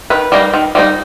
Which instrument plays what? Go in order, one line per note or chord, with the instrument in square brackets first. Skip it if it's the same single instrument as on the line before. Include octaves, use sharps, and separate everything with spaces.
[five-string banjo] D#3 B4
G3 A#3 D#4
D#3
G3 A#3 D#4